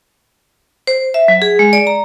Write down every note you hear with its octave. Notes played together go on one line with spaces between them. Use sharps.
C5
E5
F#3
G#4
G#3
D5
A#5